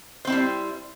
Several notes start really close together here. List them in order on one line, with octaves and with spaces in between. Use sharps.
C5 C4 E4 G3